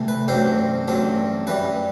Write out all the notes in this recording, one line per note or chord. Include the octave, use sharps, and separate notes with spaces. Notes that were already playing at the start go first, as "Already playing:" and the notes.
Already playing: C2 C3 E3 A3
B4
A1 G2 F#3 C4 C5
A1 G2 F#3 C4
F#2 E3 G3 B4